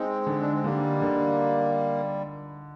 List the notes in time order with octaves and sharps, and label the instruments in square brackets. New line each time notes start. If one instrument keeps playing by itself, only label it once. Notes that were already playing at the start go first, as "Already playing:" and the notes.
Already playing: [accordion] G#3 C4 [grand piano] D#4
[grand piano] D3
[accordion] D4
C4
[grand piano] D3 [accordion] G3 A#3
[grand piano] D3